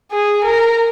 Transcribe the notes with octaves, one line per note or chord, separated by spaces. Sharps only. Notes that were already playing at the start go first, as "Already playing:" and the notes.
G#4
A#4